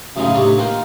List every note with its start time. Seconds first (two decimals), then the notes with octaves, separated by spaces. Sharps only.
0.16 F#2 A2 C#3 E3 G#3 D#4
0.34 A2 C3 D4 C#5 D5 C#6
0.58 D#3 A#3 F4 F#5 G5